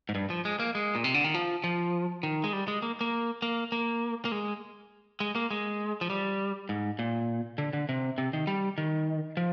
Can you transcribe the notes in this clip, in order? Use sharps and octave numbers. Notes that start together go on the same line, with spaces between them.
G#2
G2
F3
G#3
A#3
G#3
A#2
C3
D3
D#3
F3
F3
D#3
G#3
G3
G#3
A#3
A#3
A#3
A#3
A#3
G#3
G#3
A#3
G#3
F3
G3
G#2
A#2
D3
D3
C3
C3
D#3
G3
D#3
F3